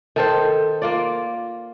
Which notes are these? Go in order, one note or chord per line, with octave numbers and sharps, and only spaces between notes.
D#3 A4 C5
A#3 F4 D5